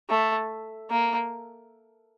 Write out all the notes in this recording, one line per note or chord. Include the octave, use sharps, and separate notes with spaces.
A3
A#3